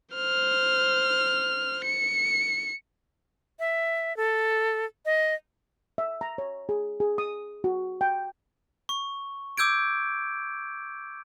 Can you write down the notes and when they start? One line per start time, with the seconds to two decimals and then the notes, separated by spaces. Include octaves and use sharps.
0.15 C5 F6
1.85 C#7
3.59 E5
4.17 A4
5.05 D#5
5.98 E5
6.21 A#5
6.38 C#5
6.69 G#4
7.00 G#4
7.18 D#6
7.64 F#4
8.01 G5
8.89 C#6
9.57 D6 E6 G6 G#6 D7